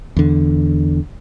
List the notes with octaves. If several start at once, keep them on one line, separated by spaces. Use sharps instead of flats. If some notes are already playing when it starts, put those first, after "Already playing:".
E2 D3